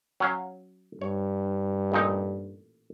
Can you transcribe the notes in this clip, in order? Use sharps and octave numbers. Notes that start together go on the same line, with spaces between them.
F#3 C#4 F5
G2 C#5
A1 A#2 D#4